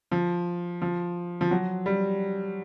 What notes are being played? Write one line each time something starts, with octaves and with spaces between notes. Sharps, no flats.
F3
F3
F3
F#3
G3